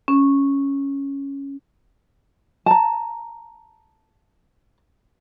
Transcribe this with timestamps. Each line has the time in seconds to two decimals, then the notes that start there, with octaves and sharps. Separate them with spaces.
0.08 C#4
2.66 A5 A#5